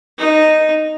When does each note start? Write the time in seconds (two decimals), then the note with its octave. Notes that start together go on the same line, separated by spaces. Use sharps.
0.19 D#4